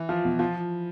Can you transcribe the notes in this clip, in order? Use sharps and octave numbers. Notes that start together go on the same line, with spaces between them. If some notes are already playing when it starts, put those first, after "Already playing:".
Already playing: E3
F3 F4
B2
F3 F4